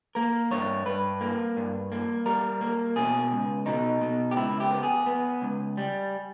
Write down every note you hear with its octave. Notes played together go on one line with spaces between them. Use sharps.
A#3 A#4
G2 C#5
G2 B4
A#3
G2
A#3
G3 A#4
A#3
B2 G#4
C#2
B2 D#4
B2
G4
C#2 E4
G4
B3
G#4
B3
C#2
G3